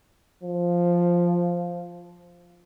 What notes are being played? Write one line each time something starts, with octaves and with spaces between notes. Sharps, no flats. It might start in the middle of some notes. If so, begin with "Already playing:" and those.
F3